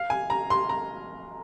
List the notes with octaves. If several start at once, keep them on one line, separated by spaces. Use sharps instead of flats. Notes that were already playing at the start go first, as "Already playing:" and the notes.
Already playing: F5
G#5
A#5
C6
A#5